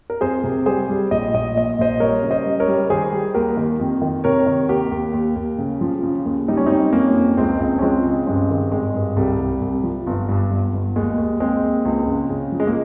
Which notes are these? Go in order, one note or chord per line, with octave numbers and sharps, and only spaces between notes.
A#4
F2 G#4 C5
C3
G3 G#4 C5
G3
A#1 D#5
A#1 D#5
A#2 D#5
A#1 C5 D#5
G3 A#4 C#5
C#3
C5 D#5
G3
A#4 C#5
G3
D#3 G#4 C5
G3
D#2 G4 A#4
D#3
F2
D#3
C3 A#4 C#5
D#3
D#2 G4 A#4
D#2
D#2
D#2
C#3
F3
C#3
D#2
G3 D#4
C#4
G3 C4 D#4
F2 A#3 C#4
F2
C#2 G#3 C4
C#2
C#4
F3 G#3 C4
C#3
G2 G#3 C4
D#3
G#1 G#3
G2
C2 G3
C2
C2
F3
G1
G2
G1
G1
D#2 G#3
D#2
D#2 G#3 C4
D#2
C#2
C#3
C#3
F3
G#3
A#3